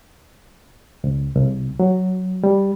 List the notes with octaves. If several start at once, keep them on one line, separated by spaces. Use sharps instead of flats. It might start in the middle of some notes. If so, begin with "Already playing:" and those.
C#2
C2
F#3
G3